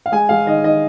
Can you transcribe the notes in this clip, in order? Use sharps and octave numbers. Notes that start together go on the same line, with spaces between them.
F5
G#3 G#5
G#3 F5
D#3 D#5
D#3 D#5